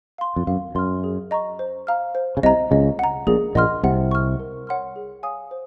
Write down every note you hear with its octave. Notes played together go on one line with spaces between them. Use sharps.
F5 C6
F2
F#2 F5
F#2 C6 F6
G#4
D#5 A#5 C#6
C5
F5 A#5 F6
C5
C#3
C2 C3 D#5 A#5
C#2 C#3 D#5
F#5 A#5
A#1 A#2 G#4
A#1 A#2 D#5 F#5 C6 F6
C2 C3 F#5
C#6 F6
A#4
C#5 F#5 C6 F6
G#4
C#5 F5 G#5 D#6
C5